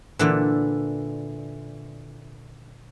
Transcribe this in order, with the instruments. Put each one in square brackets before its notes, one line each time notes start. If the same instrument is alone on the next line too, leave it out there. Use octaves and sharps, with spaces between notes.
[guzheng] A#2 D3 E3